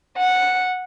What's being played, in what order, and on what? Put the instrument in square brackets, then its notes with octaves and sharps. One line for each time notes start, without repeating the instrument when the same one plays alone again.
[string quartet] F#5